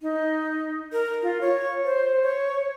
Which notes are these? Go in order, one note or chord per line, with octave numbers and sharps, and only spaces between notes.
D#4
A#4
F4
C#5
C5
C#5